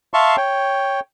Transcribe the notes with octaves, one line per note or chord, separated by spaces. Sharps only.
E5 F5 A5 C6 C#6
C#5 G5